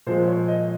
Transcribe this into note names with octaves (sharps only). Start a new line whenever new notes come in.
A#2 F3 G#3 C5
C#5
D#5